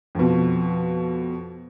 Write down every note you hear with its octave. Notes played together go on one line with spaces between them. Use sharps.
F2 B2